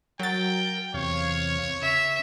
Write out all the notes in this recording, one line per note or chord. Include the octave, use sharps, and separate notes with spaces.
F#3 A#4 G5 A6
E2 C3 C#5 F5
C#3 E5